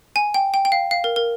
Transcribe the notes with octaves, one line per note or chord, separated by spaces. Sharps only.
G#5
G5
G5
G5
F5
F5
A#4
A#4